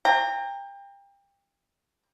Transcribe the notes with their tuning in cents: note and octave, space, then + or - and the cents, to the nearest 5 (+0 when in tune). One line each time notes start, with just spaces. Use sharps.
G5 +30 A#5 -20